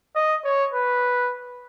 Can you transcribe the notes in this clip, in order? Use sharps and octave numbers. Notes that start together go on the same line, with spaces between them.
D#5
C#5
B4